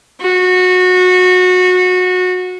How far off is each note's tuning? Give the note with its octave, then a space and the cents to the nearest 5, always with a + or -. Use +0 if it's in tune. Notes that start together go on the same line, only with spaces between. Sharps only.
F#4 -20